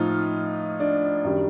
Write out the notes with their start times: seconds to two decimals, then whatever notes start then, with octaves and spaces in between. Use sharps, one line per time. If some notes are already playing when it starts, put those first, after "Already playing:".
Already playing: A2 F3 D#4 F4
0.80 D4
1.24 F#2 D#3 G3